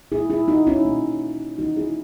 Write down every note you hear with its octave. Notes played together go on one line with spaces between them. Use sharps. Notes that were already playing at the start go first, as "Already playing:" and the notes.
A#2 A#3 E4 G#4
E4 G#4
D#4 F#4
C#4 E4
B2 A#3
C#3 E3 A#3 D#4 F#4
E4 G#4